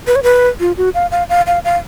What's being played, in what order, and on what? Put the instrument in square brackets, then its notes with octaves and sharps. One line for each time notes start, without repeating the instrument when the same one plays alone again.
[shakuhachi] B4
C#5
B4
F4
F#4
F5
F5
F5
F5
F5